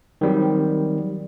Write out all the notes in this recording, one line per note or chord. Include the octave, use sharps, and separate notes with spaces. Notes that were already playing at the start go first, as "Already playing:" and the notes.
D#3 F#3 G3 C4